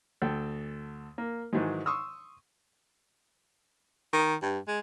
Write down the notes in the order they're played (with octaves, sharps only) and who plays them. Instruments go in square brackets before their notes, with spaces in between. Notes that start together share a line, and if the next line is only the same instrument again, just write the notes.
[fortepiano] D2 A4 G5
A#3
G#2 D#3 E3 F#3 G#3
C6 C#6 D#6 E6
[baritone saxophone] D#3
G2
G#3